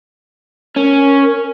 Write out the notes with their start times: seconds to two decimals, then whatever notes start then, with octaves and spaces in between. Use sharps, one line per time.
0.76 C#4 A#4